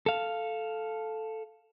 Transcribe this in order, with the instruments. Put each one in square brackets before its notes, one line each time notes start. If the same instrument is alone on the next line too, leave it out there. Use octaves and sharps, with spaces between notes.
[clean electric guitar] A4 F5